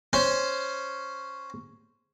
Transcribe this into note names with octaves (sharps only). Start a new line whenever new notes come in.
C#4 C5